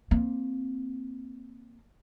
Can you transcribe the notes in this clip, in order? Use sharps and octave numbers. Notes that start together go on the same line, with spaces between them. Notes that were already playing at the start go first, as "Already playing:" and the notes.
A#3 C4